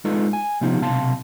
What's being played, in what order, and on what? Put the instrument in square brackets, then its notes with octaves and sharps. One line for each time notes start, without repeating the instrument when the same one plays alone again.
[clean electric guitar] G#3 D#4 F4 A4 B4
G#5
C3 F3 B3 D#4 F4 G4
B1 C3 F5 A5 C6